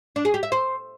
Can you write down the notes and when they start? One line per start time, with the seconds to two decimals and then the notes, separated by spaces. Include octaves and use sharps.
0.16 D4
0.25 G#4
0.34 G4
0.43 E5
0.52 C5